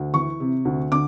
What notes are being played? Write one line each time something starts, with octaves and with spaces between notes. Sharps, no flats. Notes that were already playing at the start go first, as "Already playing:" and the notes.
Already playing: D2
E3 C#6
C3
D2
D3 D6